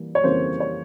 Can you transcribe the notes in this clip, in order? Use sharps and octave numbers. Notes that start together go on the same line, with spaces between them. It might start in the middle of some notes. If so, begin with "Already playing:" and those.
Already playing: E3 G3 A#3
C#5
F2 C#3 E3 G3 A#3 C5
C#5